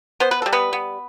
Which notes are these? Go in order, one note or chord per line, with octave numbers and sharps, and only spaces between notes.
B3 C5
B4
G3 A4
B3 B4
B3